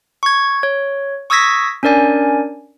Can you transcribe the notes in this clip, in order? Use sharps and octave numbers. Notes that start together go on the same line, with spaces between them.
C#6 G#6
C#5
C#6 D#6 E6 G#6 A#6 B6
C#4 D4 A#4 D5 G#5